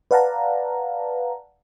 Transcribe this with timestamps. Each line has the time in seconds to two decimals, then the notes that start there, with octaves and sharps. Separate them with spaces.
0.11 B4 D5 F5 F#5 A5 A#5